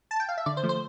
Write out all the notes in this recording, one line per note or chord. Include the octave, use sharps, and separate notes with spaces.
A5
G5
F5
E5
D3 D5
C5
F3 A3
C5